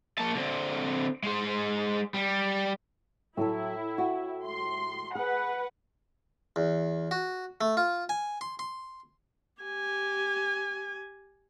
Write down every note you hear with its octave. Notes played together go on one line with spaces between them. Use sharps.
A#3 A5
D3 C4
G#3 C5
G3
A2 F#3 E4 A4
F#4
C6
G#4 B4 F#5
E2
F#4
A3
F4
G#5
C6
C6
G4 G#5